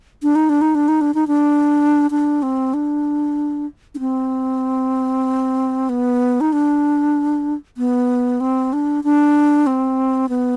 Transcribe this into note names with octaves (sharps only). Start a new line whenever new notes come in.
D4
D#4
D4
D#4
D4
D#4
D4
D#4
D4
D4
C4
D4
D4
C4
B3
D#4
D4
B3
C4
D4
D4
C4
B3